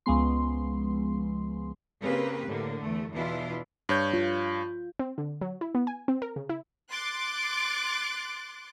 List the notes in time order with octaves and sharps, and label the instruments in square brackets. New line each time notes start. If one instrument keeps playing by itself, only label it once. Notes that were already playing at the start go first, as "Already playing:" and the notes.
[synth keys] C#2 F3 G#3 B3 C6
[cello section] C#3 A#3 C4 G4 B4
A2 D3 A#3
E2 A3
E2 B2 E3 D4 E4 F4
[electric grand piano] G2 C#5 G6
[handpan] F4
[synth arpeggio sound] C4
D3
F#3
E4
B3
G#5
C4
A#4
C#3
E4
[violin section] C6 D6 F#6 A6 D7